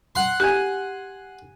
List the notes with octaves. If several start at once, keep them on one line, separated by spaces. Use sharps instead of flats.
F#5 C6
G4 G#5 F#6